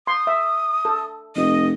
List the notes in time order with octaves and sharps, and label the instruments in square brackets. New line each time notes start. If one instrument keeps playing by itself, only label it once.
[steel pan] C6 [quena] D#6
[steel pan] E5
A4
[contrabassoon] F1 [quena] D#5